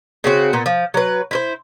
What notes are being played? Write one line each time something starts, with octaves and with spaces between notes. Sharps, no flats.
C#3 C4 F#4
A#2 B3
F3
F#3 B4
E4 F4 C5